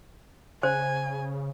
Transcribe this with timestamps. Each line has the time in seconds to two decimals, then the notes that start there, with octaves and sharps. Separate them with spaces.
0.63 C#3 C5 G#5